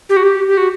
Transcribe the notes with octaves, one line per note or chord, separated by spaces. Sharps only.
G4
F#4
G4
G4
F#4